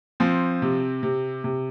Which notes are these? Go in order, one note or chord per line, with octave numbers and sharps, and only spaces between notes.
F3 C4
C3
C3
C3